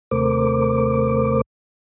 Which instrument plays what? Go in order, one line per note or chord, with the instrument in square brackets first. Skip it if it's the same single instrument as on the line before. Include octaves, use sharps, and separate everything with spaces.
[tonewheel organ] D#2 C3 A3 A#4 C5 D6